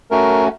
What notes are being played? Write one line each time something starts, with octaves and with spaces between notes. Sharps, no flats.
A3 C#4 F#4 A#4